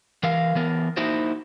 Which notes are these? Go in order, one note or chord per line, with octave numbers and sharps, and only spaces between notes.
E3 A#4 F5
E3 B3 A#4
A#3 D#4 E4 F#4 C5